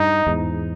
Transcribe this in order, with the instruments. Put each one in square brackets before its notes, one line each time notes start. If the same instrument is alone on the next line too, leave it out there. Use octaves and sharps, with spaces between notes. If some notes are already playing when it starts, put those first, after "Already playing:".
Already playing: [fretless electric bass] G2 [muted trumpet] D#4
[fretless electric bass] E2 G#2